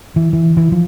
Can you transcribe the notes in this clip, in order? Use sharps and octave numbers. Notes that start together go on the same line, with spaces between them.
E3
E3
E3
F3